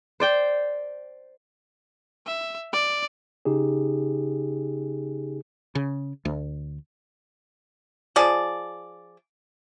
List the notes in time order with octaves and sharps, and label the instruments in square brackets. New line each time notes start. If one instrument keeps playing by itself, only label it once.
[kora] C5 D5 G5
[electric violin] E5
D5
[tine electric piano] C#3 D#4 G4 G#4
[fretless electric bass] C#3
D2
[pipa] F3 G#4 D5